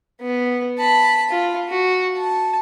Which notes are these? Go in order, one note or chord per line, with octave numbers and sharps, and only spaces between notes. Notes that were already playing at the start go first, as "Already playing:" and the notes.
B3
A5 B5
F4
F#4
A5